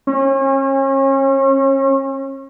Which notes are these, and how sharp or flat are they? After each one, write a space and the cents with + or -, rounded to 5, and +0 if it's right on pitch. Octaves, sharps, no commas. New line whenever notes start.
C#4 -35